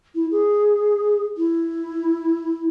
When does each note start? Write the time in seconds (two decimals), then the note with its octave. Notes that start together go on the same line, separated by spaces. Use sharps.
0.15 E4
0.31 G#4
1.37 E4